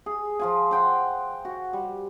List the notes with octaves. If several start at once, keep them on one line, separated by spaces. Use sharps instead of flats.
G#4
F3 F4 G#5
F#5 G5 C6
F#4
G3